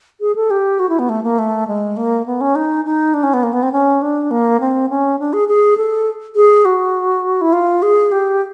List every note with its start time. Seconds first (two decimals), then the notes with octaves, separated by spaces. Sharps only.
0.21 G#4
0.35 A4
0.51 G4
0.80 F#4
0.89 E4
0.99 B3
1.09 A3
1.23 A#3
1.39 A3
1.68 G#3
1.97 A#3
2.26 B3
2.41 C#4
2.55 D#4
2.85 D#4
3.14 D4
3.23 C#4
3.34 B3
3.43 A#3
3.53 B3
3.63 C4
3.72 C#4
4.02 D4
4.31 A#3
4.60 C4
4.90 C#4
5.19 D4
5.33 G#4
5.48 G#4
5.77 A4
6.36 G#4
6.65 F#4
7.41 E4
7.53 F4
7.82 G#4
8.12 G4